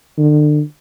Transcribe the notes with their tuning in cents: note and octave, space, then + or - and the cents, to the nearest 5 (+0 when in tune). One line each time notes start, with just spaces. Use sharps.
D3 +35